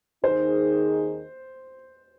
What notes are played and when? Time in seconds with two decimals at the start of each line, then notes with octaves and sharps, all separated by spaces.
0.24 D#2 D#3 C4 D#4 G#4 C5